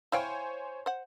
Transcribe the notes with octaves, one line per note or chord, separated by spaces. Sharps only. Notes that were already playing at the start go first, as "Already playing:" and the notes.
E4 C5 C#5 F5 G5 G#5
C5 F#5